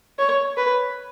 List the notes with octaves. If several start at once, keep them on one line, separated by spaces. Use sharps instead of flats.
C#5
B4